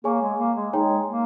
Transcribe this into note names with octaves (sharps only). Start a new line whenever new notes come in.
A#3 G#4 C#5 G#5 C#6
G#3
A#3
G#3
G#3 D#4 G#4 C#5 G5 A#5
A#3